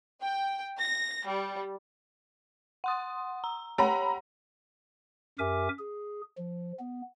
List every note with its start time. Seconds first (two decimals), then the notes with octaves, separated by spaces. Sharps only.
0.23 G5
0.78 A#6
1.25 G3
2.84 F#5 C6 D#6
3.44 A#5
3.78 G4 C#5 F#5 A#5 B5
5.39 F#2 G4 A#4 E5 G#5 D6
5.79 G#4
6.38 F3
6.79 B3